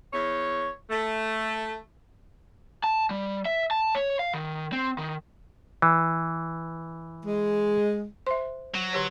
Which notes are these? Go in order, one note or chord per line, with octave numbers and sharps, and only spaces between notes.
E2 C#5
A3
A5
G3
E5
A5
C#5
F5
D#3
C4
D#3
E3
G#3
C5 E5 C6
F#3
D3 G4 C#5